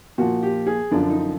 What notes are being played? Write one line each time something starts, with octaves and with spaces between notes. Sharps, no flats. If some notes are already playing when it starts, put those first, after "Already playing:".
A#2 F3 F#4
G4
G#4
F#2 D3 F3 D4
D#4